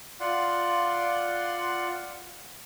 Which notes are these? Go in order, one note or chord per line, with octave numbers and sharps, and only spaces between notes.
F4 D5 F#5 C6